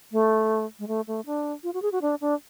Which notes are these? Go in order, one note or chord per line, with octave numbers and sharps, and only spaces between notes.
A3
G#3
A3
A3
D4
F4
F#4
G#4
F#4
D4
D4